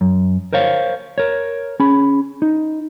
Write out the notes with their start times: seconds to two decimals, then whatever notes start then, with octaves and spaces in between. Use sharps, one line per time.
0.01 F#2
0.53 A#4 C5 C#5 F5
1.18 A#4 C#5
1.80 C#4 G#4 B5
2.42 D#4